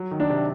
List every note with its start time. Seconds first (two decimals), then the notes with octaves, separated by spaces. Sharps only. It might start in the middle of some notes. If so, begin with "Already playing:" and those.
Already playing: F#3
0.11 D#3
0.20 D4
0.30 C3